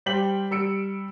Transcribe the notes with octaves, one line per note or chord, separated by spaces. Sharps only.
G3 C5 G5 D6 B6 F#7
G3 E6 C#7 D7